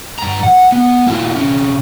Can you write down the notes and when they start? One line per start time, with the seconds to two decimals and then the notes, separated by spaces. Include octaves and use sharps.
0.19 G2 A#5
0.43 F#5
0.72 B3
1.07 A#3 E4 F4
1.36 C3 C#4